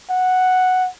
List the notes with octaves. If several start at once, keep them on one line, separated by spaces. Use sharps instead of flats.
F#5